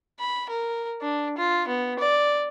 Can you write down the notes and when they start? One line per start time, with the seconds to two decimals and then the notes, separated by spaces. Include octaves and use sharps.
0.20 B5
0.50 A#4
1.02 D4
1.38 F4
1.68 B3
1.99 D5